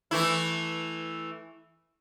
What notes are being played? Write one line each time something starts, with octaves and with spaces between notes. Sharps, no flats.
E3 A3 E4